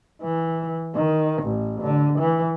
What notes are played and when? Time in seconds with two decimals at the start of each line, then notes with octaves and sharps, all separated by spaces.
0.22 E3
0.94 D#3
1.42 A1
1.81 D3
2.19 E3